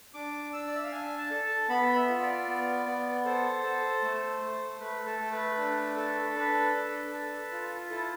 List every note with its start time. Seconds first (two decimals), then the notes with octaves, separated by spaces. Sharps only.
0.14 D4 D6
0.53 D4 E6
0.67 D5
0.75 E5
0.83 F5
0.92 D4 G#5
1.18 A5
1.31 A4
1.44 A5
1.69 B3 B5
1.95 E5
2.09 F4
2.21 D5
2.47 B3
2.86 B3
3.25 A4 C5
3.63 A4
4.02 A3
4.41 A3
4.80 A3 B4
5.06 A4
5.19 A3
5.32 B4
5.58 D4
5.97 A4
6.36 D4 B4
6.74 D4
7.13 A4
7.52 F4
7.91 E4 A4